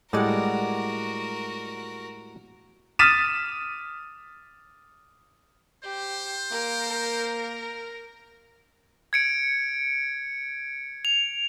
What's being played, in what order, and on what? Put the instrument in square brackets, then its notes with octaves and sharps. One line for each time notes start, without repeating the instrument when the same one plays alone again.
[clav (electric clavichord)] A2 G3 G#3 [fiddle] F#4 A#4 [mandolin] D5 F#5
[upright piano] D#6 F6 A6 B6 D#7 E7
[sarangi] G4 [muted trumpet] C5
[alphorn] A#3 [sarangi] A#4
[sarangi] A#4
[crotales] G#6 C#7 D7
F7